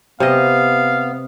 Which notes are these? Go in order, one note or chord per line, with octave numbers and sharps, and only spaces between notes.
C3 B3 D#5 F5